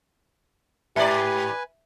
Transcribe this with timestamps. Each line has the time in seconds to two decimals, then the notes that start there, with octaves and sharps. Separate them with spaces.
0.96 G#2 G4 B4 D5 E5 G#5 A#5